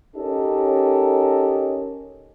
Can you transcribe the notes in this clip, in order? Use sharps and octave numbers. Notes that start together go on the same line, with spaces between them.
C#4 D#4 G4 A4 A#4 D#5